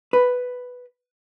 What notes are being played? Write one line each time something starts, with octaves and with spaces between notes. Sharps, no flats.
B4